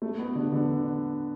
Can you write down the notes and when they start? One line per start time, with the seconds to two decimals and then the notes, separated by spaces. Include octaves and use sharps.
0.02 A3
0.19 B3
0.35 D3
0.53 D3